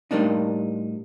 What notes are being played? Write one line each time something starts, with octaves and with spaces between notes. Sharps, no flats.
A2 G3 A#3 D4 D#4